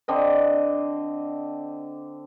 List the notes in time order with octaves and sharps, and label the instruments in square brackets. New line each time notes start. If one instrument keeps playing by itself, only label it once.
[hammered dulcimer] D3 C4 D5 D#5